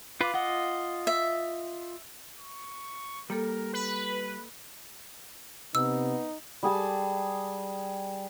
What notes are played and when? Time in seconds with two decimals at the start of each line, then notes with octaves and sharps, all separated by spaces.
0.21 F4 B4 F5 D6
0.34 F4 D#5 F#5
1.07 E5
2.40 C#6
3.30 G3 A#3 A4 A#4
3.73 B4 B5
5.75 C3 B3 D#4 E6
6.63 G3 G#4 G#5 A5